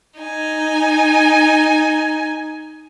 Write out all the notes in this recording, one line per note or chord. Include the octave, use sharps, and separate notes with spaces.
D#4 G#5